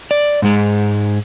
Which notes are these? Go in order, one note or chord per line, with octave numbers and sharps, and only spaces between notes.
D5
G#2 G#3